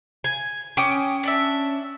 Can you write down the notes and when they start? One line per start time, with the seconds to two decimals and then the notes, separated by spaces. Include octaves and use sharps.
0.24 G#5
0.77 C#4 G5 D6 D#6
1.23 D4 D5 E5